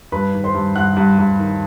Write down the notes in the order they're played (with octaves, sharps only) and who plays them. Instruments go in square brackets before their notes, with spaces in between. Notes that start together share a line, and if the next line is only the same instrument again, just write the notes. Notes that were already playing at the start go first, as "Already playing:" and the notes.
[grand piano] G2 B4 B5
D#3
C5 C6
G2
G2 F#5 F#6
G2
G2
D#3